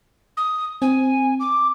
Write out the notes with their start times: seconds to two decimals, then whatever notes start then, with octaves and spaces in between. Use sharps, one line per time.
0.37 D#6
0.82 C4 G#5
1.40 D6